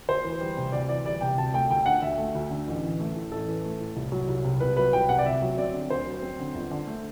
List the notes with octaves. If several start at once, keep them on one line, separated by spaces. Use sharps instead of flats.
D2 C5
E3
G3
C3
D2 D5
E3 D5
G3 D5
C3 G5
D2 A5
A3 G5
D2 G5
D3 F#5
D2 E5
A3
D2
D3
A1
E3
A3
A2
A1 A4
E3
A3
A2
C2
F#3
C2
C3
C2 B4
F#3 B4
C2 G5
C3 F#5
D5
D2 E5
F#3
C4 D5
D3
D2 C5
F#3
C4
D3
G1
D3
A3